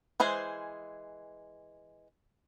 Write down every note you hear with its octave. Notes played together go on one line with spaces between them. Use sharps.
E3 G#3 G#4 C5